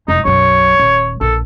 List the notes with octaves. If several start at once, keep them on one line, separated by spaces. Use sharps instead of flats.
F1 D#4 E4
B1 F#2 C#5
D#1
A#1 A4